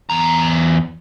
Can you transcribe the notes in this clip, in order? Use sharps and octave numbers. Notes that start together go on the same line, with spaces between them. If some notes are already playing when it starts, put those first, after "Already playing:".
E2 A#5